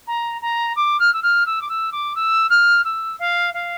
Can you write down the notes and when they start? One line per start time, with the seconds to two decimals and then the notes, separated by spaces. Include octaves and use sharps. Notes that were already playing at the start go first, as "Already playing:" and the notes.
0.06 A#5
0.41 A#5
0.76 D6
0.99 F6
1.13 E6
1.22 F6
1.45 E6
1.61 D6
1.68 E6
1.92 D6
2.15 E6
2.49 F6
2.84 E6
3.19 F5
3.53 F5